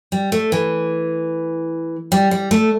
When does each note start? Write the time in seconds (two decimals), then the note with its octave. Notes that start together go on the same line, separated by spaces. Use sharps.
0.12 G3
0.32 A3
0.52 E3
2.12 G3
2.31 G3
2.51 A3